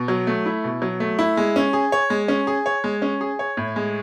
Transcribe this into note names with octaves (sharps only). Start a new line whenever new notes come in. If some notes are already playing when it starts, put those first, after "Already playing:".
Already playing: B2
F#3
A3
E4
B2
F#3
A3
E4
G#3
C#4
G#4
C#5
G#3
C#4
G#4
C#5
G#3
C#4
G#4
C#5
A2
G#3